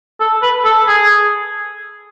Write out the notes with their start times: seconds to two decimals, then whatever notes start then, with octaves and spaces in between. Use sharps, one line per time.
0.20 A4
0.42 B4
0.65 A4
0.87 G#4